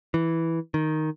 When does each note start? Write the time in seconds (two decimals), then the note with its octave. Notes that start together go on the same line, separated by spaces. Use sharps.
0.14 E3
0.74 D#3